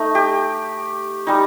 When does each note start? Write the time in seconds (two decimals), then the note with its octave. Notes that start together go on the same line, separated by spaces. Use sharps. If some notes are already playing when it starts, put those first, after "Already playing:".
Already playing: A3 D#4
0.15 G4
1.27 G3 D#4